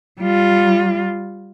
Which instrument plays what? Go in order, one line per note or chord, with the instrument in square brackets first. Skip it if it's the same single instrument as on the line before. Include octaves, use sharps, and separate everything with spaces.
[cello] G3 F4